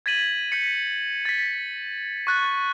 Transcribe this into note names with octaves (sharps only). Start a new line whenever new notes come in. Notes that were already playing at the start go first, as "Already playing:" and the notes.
G#6 A6 B6 D#7 F#7
G6 B6 C#7
A6 B6
C#6 F#6 A6